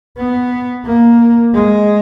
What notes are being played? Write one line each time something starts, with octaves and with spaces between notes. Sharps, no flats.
B3
A#3
G#3